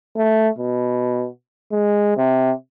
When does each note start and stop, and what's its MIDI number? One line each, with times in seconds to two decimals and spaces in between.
0.16 0.49 57
0.58 1.27 47
1.72 2.15 56
2.17 2.51 48